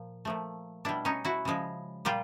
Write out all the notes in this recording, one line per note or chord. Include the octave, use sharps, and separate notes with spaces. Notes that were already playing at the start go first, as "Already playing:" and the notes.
Already playing: A#2 F3
A#2 F3 A3
B2 G3 D4 E4
C#4 D#4
E4 F#4
C#3 F3 G#3
A#2 G3 F4 G4